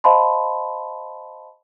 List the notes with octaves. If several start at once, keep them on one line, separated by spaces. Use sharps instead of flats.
C5 D#5 F5 A5 B5 C6